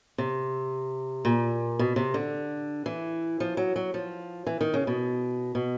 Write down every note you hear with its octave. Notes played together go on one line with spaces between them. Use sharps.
C3
A#2
B2
C3
D3
E3
F3
F#3
F#3
F3
E3
D#3
C#3
B2
B2